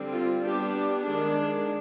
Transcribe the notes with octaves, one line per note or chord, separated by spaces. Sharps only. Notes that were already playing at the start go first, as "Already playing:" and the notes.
Already playing: D3 G3 C4
F4
G3 B3 D4 G4
D#3 G#3 D4